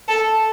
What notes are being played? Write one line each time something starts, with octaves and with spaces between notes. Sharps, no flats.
A4